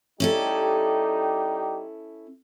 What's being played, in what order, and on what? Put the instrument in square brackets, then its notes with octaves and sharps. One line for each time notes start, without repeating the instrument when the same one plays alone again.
[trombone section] G3 D#4 G4 [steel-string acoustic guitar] C#4 E4 A4